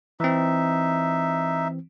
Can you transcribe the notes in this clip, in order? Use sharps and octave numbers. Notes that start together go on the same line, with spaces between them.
E3 C4 D#4 E5